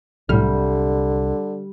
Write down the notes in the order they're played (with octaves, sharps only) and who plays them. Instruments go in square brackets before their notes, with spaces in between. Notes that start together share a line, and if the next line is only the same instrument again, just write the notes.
[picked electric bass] C2 [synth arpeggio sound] A2 F6 [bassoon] D3 [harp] G3